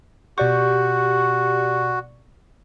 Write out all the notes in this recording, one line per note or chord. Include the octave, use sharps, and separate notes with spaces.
B2 F#4 G4 D5 C#6